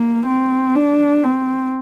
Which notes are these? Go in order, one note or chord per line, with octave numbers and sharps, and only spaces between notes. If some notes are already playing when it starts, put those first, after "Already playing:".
Already playing: A#3
C4
D4
C4